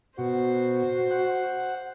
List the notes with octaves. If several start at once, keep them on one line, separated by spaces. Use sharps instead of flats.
B2 F#4 C5
F#5